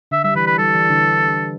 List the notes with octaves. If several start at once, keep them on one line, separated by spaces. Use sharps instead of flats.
D3 E5
G3 E5
E3 B4
B4
G3 A4
E3
D3